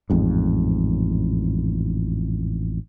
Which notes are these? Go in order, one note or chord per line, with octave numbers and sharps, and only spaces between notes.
A1 F2 G#2